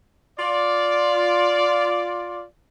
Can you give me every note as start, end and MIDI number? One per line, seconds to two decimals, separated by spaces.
0.39 2.43 65
0.39 2.43 74